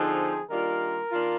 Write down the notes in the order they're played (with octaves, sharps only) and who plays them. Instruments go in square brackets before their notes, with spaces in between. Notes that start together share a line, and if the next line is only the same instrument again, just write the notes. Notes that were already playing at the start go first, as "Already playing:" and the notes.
Already playing: [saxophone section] D3 F3 C4 D#4 [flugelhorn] G#4
[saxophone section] D#3 G3 A#3 D4 F4 [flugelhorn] A#4
[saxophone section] D#3 A#3 D4 F4